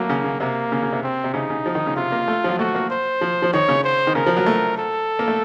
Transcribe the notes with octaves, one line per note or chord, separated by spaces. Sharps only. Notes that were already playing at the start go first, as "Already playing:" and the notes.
Already playing: F#3 A3 A#3
C#3
C#3
C3 A#3
C#3
C#3
C3
C4
C3
C#3 D#4
C#3
F3
D#3
C#3
C3 F4
A#3
A3
F3
F#3
A3 F#4
A#3
C5
F3
F3
D#3 C#5
C#3
C5
D#3
C#3 A#4
F3
F#3
A3
A4
A#3
A3